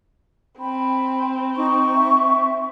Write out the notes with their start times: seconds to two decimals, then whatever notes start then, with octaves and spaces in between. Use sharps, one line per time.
0.60 C4 G5 B5
1.57 D#4 C#6
1.94 E5